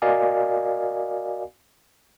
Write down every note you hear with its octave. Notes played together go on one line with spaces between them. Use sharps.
F#4 A#4 D5 D#5 F5 G#5